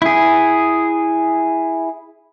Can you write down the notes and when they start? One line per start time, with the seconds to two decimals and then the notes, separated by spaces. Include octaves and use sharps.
0.02 E4 G#4